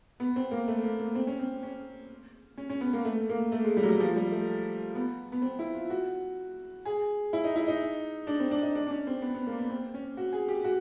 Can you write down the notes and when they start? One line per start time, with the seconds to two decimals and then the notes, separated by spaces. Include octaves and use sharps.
0.20 B3
0.36 C4
0.51 A#3
0.68 A3
0.83 A#3
1.00 A#3
1.15 C4
1.27 C#4
1.39 C4
1.63 C#4
2.58 C#4
2.70 C#4
2.81 B3
2.93 A#3
3.05 A3
3.29 A#3
3.52 A3
3.64 G#3
3.77 G3
3.83 F#3
3.89 G3
4.00 F3
4.16 G3
4.32 A3
4.95 B3
5.32 B3
5.42 C4
5.59 E4
5.75 F4
5.90 F#4
6.85 G#4
7.33 E4
7.44 D#4
7.56 E4
7.68 D#4
8.27 D4
8.40 C4
8.51 D4
8.63 D#4
8.75 D4
8.87 D4
8.90 C#4
9.07 C4
9.22 B3
9.34 B3
9.47 A#3
9.58 B3
9.69 C4
9.94 C#4
10.17 F#4
10.33 G#4
10.48 G4
10.64 F#4